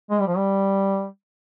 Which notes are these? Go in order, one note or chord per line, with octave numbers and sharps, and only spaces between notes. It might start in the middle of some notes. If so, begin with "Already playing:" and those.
G#3
G3
F3
G3